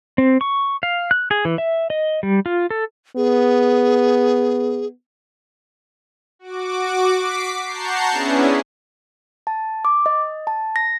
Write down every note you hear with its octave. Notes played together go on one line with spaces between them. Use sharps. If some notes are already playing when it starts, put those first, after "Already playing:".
C4
C#6
F5
F#6
G#4
E3
E5
D#5
G3
F4
A4
B3 G#4
F#4 D6
D6 B6 C7
F#5 A5 A#5 C#6 G6 C7
B3 C#4 D4 E4 G#4
A5
D6
D#5
A5
A#6